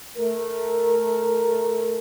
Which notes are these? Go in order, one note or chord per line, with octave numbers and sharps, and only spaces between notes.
A3 A#4